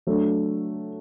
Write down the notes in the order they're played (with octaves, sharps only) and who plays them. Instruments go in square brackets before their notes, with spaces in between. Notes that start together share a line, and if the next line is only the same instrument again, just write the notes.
[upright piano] F#3 A3 D4